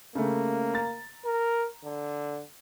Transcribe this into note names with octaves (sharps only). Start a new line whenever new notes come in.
C#3 A3 A#3
A#5 A6
A#4
D3